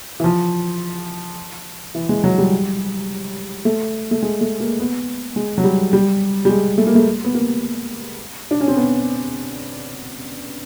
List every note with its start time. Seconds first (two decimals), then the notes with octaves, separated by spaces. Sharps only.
0.20 E3
0.24 F3
1.95 E3
2.09 G#3
2.24 F#3
2.38 G3
3.65 A3
4.11 A3
4.22 G#3
4.41 A3
4.60 A#3
4.80 B3
5.36 G#3
5.58 F#3
5.64 G3
5.93 G3
6.45 G3
6.49 G#3
6.78 A3
6.87 A#3
6.95 A3
7.25 B3
7.35 A#3
8.51 D4
8.60 C#4
8.68 C4
8.77 B3